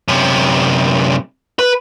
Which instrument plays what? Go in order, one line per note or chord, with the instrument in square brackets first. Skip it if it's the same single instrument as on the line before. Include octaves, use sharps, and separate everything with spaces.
[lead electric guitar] F#2 C3
B4